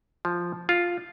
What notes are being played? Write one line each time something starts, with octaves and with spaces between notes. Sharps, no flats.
F3
F4